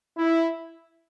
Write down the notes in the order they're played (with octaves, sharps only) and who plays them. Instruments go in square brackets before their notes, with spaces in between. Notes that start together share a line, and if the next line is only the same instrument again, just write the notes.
[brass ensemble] E4